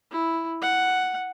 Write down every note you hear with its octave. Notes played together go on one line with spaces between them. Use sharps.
E4
F#5